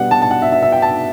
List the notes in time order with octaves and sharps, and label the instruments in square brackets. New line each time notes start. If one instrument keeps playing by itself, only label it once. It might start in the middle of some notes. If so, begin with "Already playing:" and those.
Already playing: [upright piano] B2 G3 B3 D4 F#5
A5
A5
F#5
E5
E5
E5
G5
A5